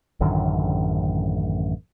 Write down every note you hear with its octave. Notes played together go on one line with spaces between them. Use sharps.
A1 F#2 D3 D#3